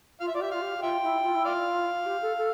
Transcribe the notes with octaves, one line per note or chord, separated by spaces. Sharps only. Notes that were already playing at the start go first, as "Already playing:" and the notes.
F4 F5
E5
F4 D5
G4 E5
F4 F5
G4
G4
F4 E5 G5
E4
F4
E4
F4 D5 F5
F4
G4
A4
A4